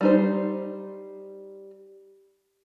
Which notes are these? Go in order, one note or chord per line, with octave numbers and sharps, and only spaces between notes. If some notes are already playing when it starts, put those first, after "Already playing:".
G3 D#4 C5